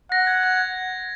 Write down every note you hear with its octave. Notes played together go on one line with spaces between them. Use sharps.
F#5 A#6
G#6
G#6